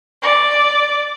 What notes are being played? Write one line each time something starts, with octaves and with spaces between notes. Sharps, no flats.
D5